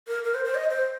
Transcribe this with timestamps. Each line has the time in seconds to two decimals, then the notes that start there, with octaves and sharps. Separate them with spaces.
0.08 A#4
0.24 A#4
0.34 C5
0.45 C5
0.55 D#5
0.70 C5